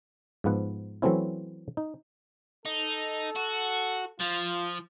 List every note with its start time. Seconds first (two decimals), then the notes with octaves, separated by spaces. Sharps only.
0.44 G#2 F3 B3 F#5
1.02 E3 F#3 A3 C4 C#4 E4
1.77 D#4
2.65 D#4 A4
3.36 F#4
4.20 F3 F4